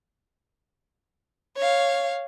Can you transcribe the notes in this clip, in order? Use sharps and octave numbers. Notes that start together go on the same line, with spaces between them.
C#5 F5